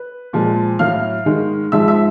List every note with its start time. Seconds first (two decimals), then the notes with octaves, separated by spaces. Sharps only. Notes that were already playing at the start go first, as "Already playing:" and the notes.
Already playing: B4
0.33 A#2 F3 G#3
0.79 A2 F#3 F5 F6
1.26 G#2 D#3 G#3
1.72 G#2 F3 G#3 E5 E6
1.88 E5 E6